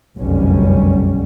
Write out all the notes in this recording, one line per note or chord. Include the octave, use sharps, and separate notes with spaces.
F1 B1 F#2 D3 G3 C#4